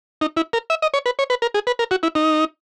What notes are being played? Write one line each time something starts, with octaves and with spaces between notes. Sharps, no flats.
D#4
E4
A#4
E5
D#5
C#5
B4
C#5
B4
A#4
G#4
B4
A#4
F#4
E4
D#4